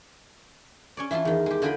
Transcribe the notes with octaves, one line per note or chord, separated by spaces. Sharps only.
C#4 C#5 D5
E3 E4 F4 A5 C6
E2 D#3
G#3 G4
D3 F4 G#4 D#5 G5 B5